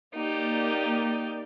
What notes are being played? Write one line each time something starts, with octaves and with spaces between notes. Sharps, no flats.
A#3 D#4 G4 D5